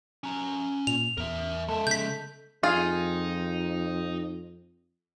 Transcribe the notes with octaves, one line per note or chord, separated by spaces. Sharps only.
C#4 A#5
A#2 F7
E2 A#4 E5
G#3 A4 E5
C#3 G6 B6
F2 D#4 F4 G#4